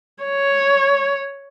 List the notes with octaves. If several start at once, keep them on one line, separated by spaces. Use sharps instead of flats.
C#5